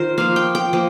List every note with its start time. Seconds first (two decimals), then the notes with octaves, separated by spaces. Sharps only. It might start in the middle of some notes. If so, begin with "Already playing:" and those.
Already playing: D#3 F4 A#4 C5
0.18 F3 A#3 F5
0.36 G5
0.55 G5
0.73 F3 A#3